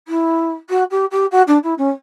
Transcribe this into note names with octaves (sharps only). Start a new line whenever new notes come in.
E4
F#4
G4
G4
F#4
D4
E4
C#4